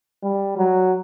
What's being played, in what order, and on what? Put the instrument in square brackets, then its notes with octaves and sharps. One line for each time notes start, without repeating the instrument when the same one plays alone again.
[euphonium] G3
F#3